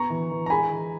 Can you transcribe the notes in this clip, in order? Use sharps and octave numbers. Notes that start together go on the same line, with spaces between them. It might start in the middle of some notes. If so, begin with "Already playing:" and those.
Already playing: B3 A#5 C#6
E3
E3
A#5
G#3 G#5 B5
E3